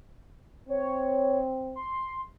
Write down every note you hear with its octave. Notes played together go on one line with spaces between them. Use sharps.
C4 C#5
C6